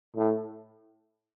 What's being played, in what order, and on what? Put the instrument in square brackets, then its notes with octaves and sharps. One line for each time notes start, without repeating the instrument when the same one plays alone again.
[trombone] A2